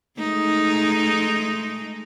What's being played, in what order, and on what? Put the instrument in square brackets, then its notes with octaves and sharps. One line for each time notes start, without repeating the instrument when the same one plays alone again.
[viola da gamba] G#3 A3 D#4